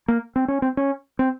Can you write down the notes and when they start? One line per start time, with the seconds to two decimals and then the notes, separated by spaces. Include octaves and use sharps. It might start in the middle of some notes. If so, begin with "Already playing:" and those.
0.08 A#3
0.36 C4
0.48 C#4
0.62 C4
0.77 C#4
1.19 C4